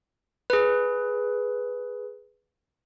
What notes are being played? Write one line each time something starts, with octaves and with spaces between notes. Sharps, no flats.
G#4 B4